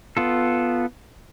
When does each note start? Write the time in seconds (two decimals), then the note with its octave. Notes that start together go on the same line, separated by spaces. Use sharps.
0.17 B3 F4 A4